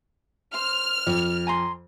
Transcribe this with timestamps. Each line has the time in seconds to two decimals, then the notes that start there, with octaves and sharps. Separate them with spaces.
0.54 C5 F6
1.07 F2
1.47 G#5 A#5 C6